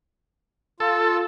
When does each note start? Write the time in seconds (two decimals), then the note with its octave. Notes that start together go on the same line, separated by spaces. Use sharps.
0.80 F4 A4